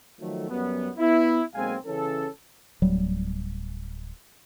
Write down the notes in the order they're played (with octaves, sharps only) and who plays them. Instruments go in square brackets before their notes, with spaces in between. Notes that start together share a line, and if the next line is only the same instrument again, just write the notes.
[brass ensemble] D#3 F3 F#3 A3
F#2 F#3 G3 B3
B3 E4
B1 G#3 A#3 C4 F5 G#5
C#3 E3 C#4 A4
[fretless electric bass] D1 F#3 G3